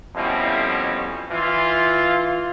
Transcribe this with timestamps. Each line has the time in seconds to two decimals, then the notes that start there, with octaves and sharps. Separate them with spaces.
0.16 F2 B2 G3 C#4 E4
1.30 E3 F4